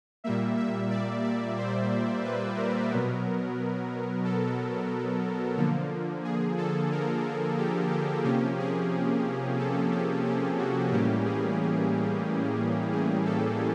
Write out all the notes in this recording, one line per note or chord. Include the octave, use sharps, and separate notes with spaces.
A#2 G3 A#3 E5
E5
D5
D5
C5
B4
A#4
B2 F#3 B3
A4
D3 F3 A#3
G#4
A4
A#4
G4
G4
C3 F3 A#3 C#4 G4
G#4
A4
G4
G4
F#4
A2 E3 G3 A#3 C#4 G4
G#4
G#4
A4